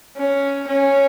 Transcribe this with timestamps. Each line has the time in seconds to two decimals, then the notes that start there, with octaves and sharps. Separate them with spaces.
0.17 C#4
0.68 C#4